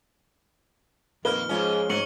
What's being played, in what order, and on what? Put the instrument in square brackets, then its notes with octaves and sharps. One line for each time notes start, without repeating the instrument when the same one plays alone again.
[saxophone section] F2 A#2 D#3 [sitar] A#3 [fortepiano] B4 [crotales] F6 G7
[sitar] G#2 C#4 [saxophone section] F3 G#3
[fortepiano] G#2 [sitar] F#3 [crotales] C#6 C#7 F#7